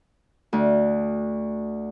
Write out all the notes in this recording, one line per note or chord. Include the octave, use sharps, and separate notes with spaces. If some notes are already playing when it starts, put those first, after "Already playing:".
D2